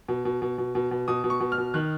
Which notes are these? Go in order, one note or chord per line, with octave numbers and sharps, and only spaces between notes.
B2
B2
B2
B2
B2
B2
B2 D#6
B2
C#6
B2
F6
B2
D#3 F#6